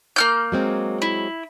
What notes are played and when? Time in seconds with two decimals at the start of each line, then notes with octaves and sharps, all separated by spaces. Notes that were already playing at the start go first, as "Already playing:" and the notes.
0.16 A#3 F6 G6
0.52 F#3 G#3 C4
1.02 E4